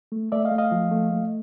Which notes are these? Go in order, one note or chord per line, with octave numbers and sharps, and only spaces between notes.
A3
A3 D5 E5
D#5 F5
A3
D#5 F5
F3
A3
A3